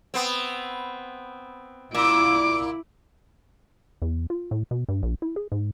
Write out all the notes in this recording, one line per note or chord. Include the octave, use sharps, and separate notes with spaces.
B3 C4
A#2 E4 D6
E2
F4
A2
B2
G2
A#1
E4
G#4
G#2